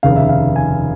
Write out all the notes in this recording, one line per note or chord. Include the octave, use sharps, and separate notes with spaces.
F1 D#2 C#3 F5
E5
F5
G#5